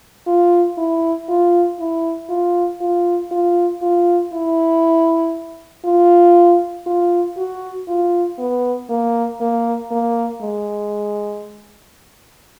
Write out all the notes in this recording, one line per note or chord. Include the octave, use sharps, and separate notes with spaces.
F4
E4
F4
E4
F4
F4
F4
F4
E4
F4
F4
F#4
F4
B3
A#3
A#3
A#3
G#3